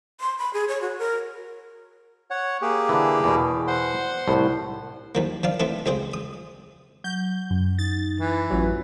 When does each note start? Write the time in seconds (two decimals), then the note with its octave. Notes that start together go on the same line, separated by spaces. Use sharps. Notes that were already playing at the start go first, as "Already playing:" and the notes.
0.20 C6
0.39 B5
0.54 G#4
0.68 C#5
0.81 F#4
0.99 A#4
2.31 C#5 F#5
2.62 A#3 G4 G#4
2.89 D3 E3
3.24 E2 B2
3.68 C5 F#5 C6
4.28 C2 A2
5.15 D#2 F3 A#3
5.43 F3 D4 F5
5.60 E3 A3 C4 A4
5.86 C#2 C4 G#4 C5
6.14 D#6
7.04 F#3 G6
7.51 F#2
7.79 D#4 A6
8.20 E3
8.50 A1 F#2 F#3 F4